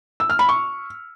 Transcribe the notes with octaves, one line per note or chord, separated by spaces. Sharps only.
E6
F6
B5
C#6